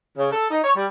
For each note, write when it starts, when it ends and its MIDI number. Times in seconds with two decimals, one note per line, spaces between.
0.18 0.30 49
0.32 0.46 69
0.50 0.59 63
0.64 0.72 73
0.76 0.86 55